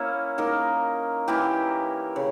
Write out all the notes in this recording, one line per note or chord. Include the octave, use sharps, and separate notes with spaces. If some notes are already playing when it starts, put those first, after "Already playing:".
Already playing: A#3 C#4 E4
A#3 D#4 A#4
E3 A#3 E4 G4
C#3